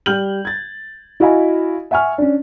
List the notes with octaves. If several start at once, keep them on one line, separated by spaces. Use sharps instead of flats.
G3 F6 G6 F#7
G#6 A6
E4 F#4 D#5 F5 G#5 B5
E5 F#5 G#5 C#6 F6
C#4 D4